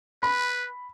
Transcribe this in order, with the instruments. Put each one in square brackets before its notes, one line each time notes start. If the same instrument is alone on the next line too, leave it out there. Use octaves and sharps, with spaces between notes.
[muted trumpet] B4 [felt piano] B5